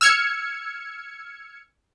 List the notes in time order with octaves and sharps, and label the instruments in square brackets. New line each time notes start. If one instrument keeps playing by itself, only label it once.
[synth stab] E6 F6 G#6 C#7